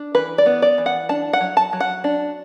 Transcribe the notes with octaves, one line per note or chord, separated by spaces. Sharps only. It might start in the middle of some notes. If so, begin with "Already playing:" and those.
Already playing: D4
E3 B4
D5
B3
D5
E3
F#5
D4 A5
F#5
F#3
A5
F#3
F#5
D4